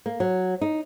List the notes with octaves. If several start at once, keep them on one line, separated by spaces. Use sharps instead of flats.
A#3
F#3
D#4